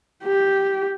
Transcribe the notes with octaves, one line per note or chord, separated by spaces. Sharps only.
G4